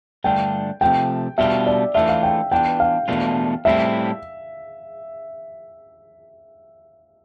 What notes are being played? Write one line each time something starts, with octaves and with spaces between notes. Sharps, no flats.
G2 D3 A3 D4 F4 G5
C3 F3 A3 G5
B2 G3 D4 F4 E5
D5
E3 A3 D4 F4 E5
F5
G5
E3 B3 D4 F4 G5
F5
E2 B2 A3 D4 F4
A2 G3 C4 E4 E5